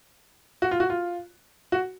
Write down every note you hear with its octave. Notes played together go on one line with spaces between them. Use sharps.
F#4
F4
F#4
F4
F#4